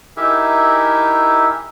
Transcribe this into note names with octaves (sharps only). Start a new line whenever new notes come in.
D#4 E4 G4 G#4 A#4 E5